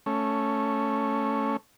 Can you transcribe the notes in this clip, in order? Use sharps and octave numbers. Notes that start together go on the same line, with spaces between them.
A3 C#4